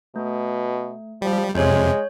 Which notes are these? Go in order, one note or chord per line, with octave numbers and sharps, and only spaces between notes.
B2 A3
F3 G3
F2 C3 G#3 C#5 G6